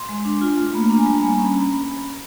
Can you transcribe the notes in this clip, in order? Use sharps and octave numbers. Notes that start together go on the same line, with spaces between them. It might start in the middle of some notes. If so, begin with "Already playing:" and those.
Already playing: C6
G#3
D4
F4
A3
A#3 B5
D4 A#5
G#5
G3 A5
A#3 B5
A#5
C#4
B5